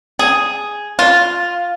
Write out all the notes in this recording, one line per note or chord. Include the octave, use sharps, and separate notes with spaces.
G#4
F4